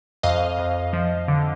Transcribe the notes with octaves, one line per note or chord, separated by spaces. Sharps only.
F2 D#5 F5
F2
F3
D3